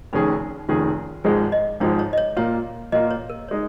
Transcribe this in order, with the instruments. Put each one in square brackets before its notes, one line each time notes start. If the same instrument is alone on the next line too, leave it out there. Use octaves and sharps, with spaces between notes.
[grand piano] F1 F2 D#3 C#4 G#4 [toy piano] D#4
[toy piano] D#4
[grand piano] F1 F2 D#3 C#4 G#4 [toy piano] F4
[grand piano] G#1 G#2 F3 G#3 [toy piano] G#4
[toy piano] D#5
[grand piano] G#1 G#2 F3 G#3 [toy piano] C#5
[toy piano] C#5
D#5
C#5
[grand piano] A#2 A#3 F4 [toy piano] C#5
[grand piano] A#2 A#3 F4 [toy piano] D#5
[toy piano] C#5
A#4
[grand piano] G#3 D#4 [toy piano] C#5